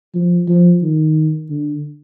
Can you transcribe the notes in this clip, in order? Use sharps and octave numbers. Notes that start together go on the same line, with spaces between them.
F3
F3
D#3
D3